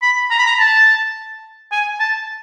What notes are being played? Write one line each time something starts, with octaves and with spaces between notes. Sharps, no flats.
B5
A#5
B5
A#5
A5
G#5
A5